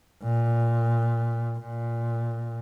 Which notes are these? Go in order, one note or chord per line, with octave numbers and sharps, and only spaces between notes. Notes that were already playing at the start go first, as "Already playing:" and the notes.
A#2
A#2